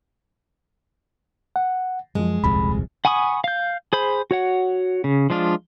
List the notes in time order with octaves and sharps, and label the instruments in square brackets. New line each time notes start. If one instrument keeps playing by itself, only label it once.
[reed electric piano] F#5
[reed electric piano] F#2 F3 [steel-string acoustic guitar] G#3
[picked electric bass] D#1 C2 F2 [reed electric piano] B5
[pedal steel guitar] F#5 G#5 B5 C#6 D#6
F5 G6
G#4 C5 B5
F#4 C#5 F#5
C#3
F3 G#3 D4 F4